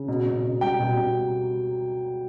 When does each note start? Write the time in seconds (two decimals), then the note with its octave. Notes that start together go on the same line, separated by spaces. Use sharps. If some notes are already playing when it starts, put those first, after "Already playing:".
Already playing: C#3
0.08 B2
0.26 B2
0.43 B2
0.61 G3 G5
0.80 B2
0.97 B2